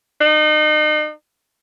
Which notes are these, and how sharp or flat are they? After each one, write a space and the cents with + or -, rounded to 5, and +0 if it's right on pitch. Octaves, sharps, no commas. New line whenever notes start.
D#4 -35